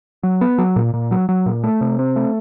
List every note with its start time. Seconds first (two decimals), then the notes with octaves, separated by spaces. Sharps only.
0.23 F#3
0.41 B3
0.58 F#3
0.76 A#2
0.94 A#2
1.11 F#3
1.29 F#3
1.46 A#2
1.64 A3
1.81 C3
1.99 C4
2.16 A3